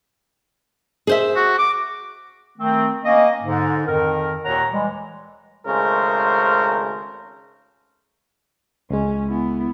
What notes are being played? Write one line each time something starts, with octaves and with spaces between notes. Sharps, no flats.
G#4 C5 E5
F#4
D6
D#3 A3 C4
A#3 C#4 D#5
G#2 D3
F2 D#3 A#4
D#2 A#2 C#5 F#5 A#5
E3 G3 G#3
G#1 C#3 G#3 A3 A#4 C5
C#2 G#3 C#4
B3 E4